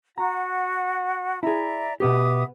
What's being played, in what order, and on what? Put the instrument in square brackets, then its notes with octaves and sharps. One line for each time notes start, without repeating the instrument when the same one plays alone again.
[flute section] F#4 F#5 [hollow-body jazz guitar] A#5
[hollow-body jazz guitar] E4 G#4 [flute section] D5 E5 A#5
[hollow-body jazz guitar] B2 B3 G4 [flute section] E5 D6 D#6